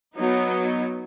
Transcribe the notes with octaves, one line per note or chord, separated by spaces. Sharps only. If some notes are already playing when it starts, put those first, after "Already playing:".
F#3 B3 D#4